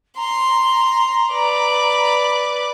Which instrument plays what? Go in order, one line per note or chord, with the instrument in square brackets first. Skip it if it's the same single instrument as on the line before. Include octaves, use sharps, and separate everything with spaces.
[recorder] A#5 [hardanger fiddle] C6
[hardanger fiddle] B4 D5